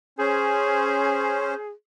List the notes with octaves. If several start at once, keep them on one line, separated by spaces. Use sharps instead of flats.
C#4 G#4 C5